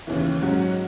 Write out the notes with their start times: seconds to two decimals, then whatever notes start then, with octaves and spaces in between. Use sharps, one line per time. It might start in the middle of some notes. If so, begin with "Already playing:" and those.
0.07 D#2 C#3 E3
0.41 G#2 F#3 C#4 F#4